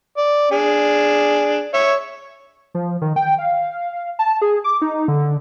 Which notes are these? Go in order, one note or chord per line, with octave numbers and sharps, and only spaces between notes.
D5
D4 G#4
C#5 E5
F3
D#3
G5
F5
A5
G#4
D6
D#4
D3